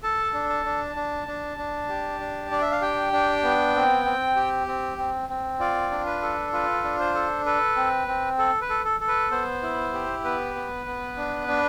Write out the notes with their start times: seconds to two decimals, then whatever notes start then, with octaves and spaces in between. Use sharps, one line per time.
0.03 A4 A5
0.34 D4
0.49 A5
0.65 D4
0.96 D4
1.27 D4
1.58 D4
1.89 G4
2.20 D4
2.51 D4 D5
2.62 E5
2.72 F5
2.82 G4 G5
3.13 D4
3.43 B3
3.74 C4
4.05 C4
4.36 G4
4.67 C4
4.98 C4
5.29 C4
5.60 F4 D5
5.91 D4
6.06 B4
6.22 A4
6.53 F4 B4
6.84 D4
6.99 C5
7.14 A4
7.45 A4 B4
7.76 C4
8.08 C4
8.38 A4
8.61 B4
8.70 A4
8.85 A4
9.00 A4
9.08 B4
9.31 B3 C5
9.62 E4
9.94 G4
10.24 B3 B4
10.55 B3
10.86 B3
11.17 D4
11.48 D4